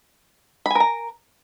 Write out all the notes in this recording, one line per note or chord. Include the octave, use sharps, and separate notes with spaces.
A#4 G#5 A#5 B5